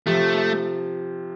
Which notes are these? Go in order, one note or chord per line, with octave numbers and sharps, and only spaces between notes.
C3 F3 A3